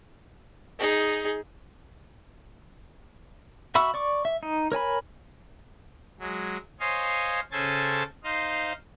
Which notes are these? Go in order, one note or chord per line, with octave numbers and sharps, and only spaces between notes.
D#4 G#4
F#4 E5 B5 C#6 E6
D5 C#6 D6
E5
D#4
A#4 C#5 G#5 B5
F#3 G#3
C5 C#5 D#5 F5 G#5
C#3 C#4 A4 C5 G#5 A6
D#4 C5 D#5 F5